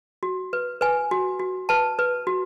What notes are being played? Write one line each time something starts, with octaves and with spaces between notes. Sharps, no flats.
F#4
B4
B4 G#5
F#4
F#4
B4 A5
B4
F#4